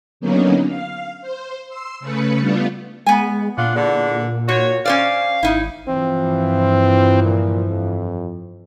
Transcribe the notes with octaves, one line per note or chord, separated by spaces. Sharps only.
D3 F#3 A#3 B3 C#4 D#4
F5
C5
C6 E6
C#3 A3 B4 C#7
G3 A3 B3 D4 F4
G#3 B3 G#5
A#2 D4 F4 F#5
E2 D3
G#2 F#4 C#5
C#4 C5 D5 F5
G#1 D#4 E4
G2 E3 F3 C4
A#2
F2